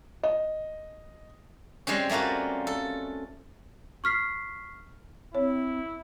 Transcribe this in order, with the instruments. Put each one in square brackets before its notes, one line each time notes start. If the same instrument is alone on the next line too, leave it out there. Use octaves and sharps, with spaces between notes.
[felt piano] D#5
[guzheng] G3 G#3 C4 C#4
G3 A3 A#3 F4 F#4
A4
[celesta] C#6 F6 B6 C7
[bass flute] C4 [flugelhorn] E4 [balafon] C#5